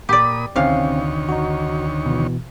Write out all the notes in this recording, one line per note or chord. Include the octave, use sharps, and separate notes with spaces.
A#2 G4 D5 B5 D#6
D2 C3 D#3 C4 C#4 C#5 F5
D#4 F#4
B2 E3